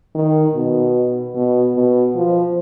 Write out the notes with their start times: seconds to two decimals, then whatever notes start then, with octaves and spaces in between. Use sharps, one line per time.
0.15 D#3
0.55 B2
1.35 B2
1.75 B2
2.15 F3